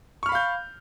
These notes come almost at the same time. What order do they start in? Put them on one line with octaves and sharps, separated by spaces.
C#6 F6 B5 F5 G6